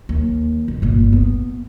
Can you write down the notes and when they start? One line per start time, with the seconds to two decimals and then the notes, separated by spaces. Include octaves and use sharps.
0.09 D#2
0.68 G1
0.82 G1 A#2
1.13 B3